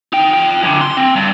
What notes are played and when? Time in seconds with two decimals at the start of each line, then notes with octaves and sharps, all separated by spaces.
0.13 D#4 G5
0.34 F4 G5
0.62 F#2 D3
0.81 C6
0.97 C4
1.16 G2